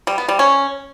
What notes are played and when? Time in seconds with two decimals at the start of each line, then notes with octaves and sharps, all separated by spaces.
0.07 G3
0.18 B3
0.28 G3
0.39 C#4